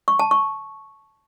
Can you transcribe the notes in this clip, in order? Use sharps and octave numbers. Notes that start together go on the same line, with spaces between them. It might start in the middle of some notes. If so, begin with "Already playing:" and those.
C#6
A5
C#6